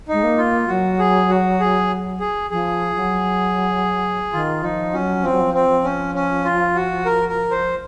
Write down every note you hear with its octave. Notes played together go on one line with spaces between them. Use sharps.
G#3 D#4
A#3
F4
F#3 F#4
G#4
F#4
G#4
G#4
F3 G#4
F#3
D#3 F4
F3 D#4
F#3 C#4
F3 C4
F#3
F3
C4
F3
C#4
C#4
F4
F#4
A#4
A#4
C5